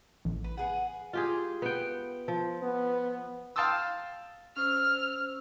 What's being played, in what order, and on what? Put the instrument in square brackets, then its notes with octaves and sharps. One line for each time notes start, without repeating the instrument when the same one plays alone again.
[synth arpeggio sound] A1
[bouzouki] B4
B3 G#4 F#5
[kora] F4 G4 G#4
B3 G5
F3
[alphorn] B3
[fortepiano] F5 G5 A5 C6 D#6 E6
[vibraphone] C#4 C5 E6 [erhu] F6